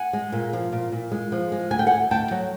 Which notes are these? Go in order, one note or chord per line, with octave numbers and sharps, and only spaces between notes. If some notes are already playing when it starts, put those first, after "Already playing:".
Already playing: F#5 G#5
G#3
A#2
F3
A#2
A#2
G#3
F3
G#3
D2 G#5
G5
F#5 G#5
D2
D2 G5 A5
F#3